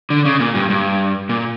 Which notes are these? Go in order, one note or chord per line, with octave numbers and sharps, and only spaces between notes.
D3
C#3
A#2
G2
G2
A#2